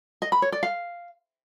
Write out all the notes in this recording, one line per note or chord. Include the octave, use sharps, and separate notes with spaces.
D#5
B5
C#5
D5
F5